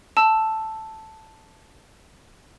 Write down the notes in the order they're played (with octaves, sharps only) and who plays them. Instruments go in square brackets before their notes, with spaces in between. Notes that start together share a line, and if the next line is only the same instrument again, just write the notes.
[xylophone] A5 E6